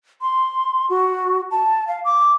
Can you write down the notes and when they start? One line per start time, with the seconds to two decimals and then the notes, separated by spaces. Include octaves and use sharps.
0.21 C6
0.90 F#4
1.51 A5
1.88 F5
2.04 D6